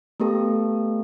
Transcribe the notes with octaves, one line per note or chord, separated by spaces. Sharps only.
A3 B3 G4 A4